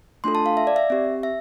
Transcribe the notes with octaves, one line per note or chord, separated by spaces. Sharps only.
A3 D4 F4 A4 C6
A5
F5
E5
D5
E5
C4 G4
E5